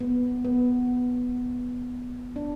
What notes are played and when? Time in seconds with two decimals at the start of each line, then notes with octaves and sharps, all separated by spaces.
0.01 B3
0.45 B3
2.36 D4